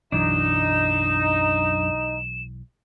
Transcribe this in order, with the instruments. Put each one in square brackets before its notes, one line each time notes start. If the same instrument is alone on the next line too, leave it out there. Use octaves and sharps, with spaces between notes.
[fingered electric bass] B1 E3 [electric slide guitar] F#2 D4 [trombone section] D#4 [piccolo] E7